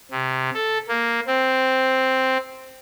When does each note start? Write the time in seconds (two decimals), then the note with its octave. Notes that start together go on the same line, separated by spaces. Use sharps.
0.11 C3
0.54 A4
0.88 A#3
1.27 C4